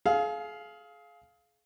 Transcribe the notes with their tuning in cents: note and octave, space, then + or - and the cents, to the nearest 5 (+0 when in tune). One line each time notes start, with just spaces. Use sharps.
G#4 +35 F5 +0